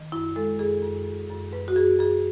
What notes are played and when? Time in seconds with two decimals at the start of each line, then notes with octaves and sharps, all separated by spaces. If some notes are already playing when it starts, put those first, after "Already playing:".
Already playing: D#3
0.12 F#2 E4
0.36 G#3 A4
0.59 F#2 G#4
0.83 F#2
1.06 F#2
1.30 F#2
1.53 F#2 B4
1.68 F#4
1.76 F#2 G#4
1.99 F#2 G#4